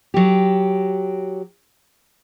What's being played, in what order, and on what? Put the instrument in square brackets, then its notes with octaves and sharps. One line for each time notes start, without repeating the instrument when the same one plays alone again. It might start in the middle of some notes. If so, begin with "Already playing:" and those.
[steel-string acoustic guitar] F#3 G4